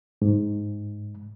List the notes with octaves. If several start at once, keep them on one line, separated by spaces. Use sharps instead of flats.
G#2